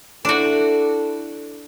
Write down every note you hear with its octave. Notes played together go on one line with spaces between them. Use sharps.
D4 E4 F#4 A4